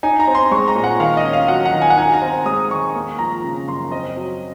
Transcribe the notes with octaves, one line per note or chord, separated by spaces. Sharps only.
D#4 G#5
A#5
C4
C6
G#3 C#6
A#5
A#2
F#5
D#3 F5
D#5
C#4
F5
F#3 F#5
F#5
D#3
G#5
F#5
D#4 G#5
A#5
C4
A#5
G#3 D#6
D#3 C#6
A#3
F3 A#5
C#3
F#2 C6
C4 D#5
F#3